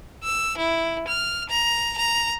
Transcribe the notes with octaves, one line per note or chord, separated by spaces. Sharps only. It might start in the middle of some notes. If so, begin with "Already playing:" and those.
E6
E4
F6
A#5
A#5